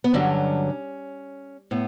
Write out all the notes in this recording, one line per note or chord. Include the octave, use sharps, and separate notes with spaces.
B3
G2 D3 F#3 C#4
A2 B3